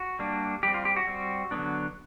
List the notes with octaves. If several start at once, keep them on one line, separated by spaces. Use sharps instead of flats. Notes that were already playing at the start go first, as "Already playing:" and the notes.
Already playing: F#4
G3 A#3 D4
G3 C4 G4
F4
G4
F#4
G3 C4
D3 F#3 B3 D4